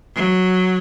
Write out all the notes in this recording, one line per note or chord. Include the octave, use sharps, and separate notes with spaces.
F#3